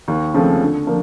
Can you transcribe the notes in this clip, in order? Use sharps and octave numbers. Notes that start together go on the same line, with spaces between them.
D#2
C#3 F3 A3 C4
D3
F3 A#3 D4